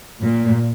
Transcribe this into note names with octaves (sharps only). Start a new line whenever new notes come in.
A#2